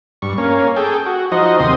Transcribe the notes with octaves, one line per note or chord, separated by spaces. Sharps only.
G2 C#6
A#3 C#4
G#4 A4 G5
F#4
F3 D#4 F#4 C5 D#5
D#2 C3 C4 C6 D#6